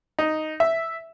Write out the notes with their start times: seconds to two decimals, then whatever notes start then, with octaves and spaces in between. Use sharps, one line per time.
0.19 D#4
0.60 E5